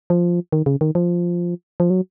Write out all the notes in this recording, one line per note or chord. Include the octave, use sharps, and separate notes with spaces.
F3
D#3
C#3
D#3
F3
F3
F#3